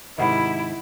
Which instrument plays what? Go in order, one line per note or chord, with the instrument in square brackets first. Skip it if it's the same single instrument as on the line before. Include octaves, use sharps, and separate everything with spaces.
[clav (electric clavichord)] G#2 C3 D#3 [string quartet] E4 [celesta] D#5 F#5 B5